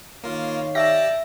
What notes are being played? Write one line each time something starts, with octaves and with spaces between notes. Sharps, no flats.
D#3 A#3 F4 C#5 F5
G4 D5 E5 A5 A#6